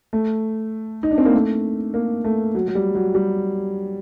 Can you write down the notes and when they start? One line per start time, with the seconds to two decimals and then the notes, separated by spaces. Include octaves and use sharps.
0.13 A3
1.03 D#4
1.11 D4
1.18 C4
1.25 A#3
1.34 A3
1.94 A#3
2.24 A3
2.55 F#3
2.68 F#3
2.75 G3
2.95 F#3
3.15 G3